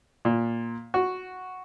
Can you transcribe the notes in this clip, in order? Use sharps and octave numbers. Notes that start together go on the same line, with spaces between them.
A#2
F#4